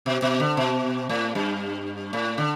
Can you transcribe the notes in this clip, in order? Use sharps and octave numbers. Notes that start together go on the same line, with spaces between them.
B2
B2
D3
B2
A2
G2
A2
D3